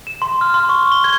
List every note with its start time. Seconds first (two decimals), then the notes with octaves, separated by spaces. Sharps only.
0.07 E7
0.22 C6
0.41 F6
0.54 C6
0.69 C#6
0.92 G7
1.04 G#6